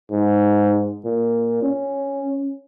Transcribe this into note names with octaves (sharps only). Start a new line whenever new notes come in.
G#2
A#2
C#4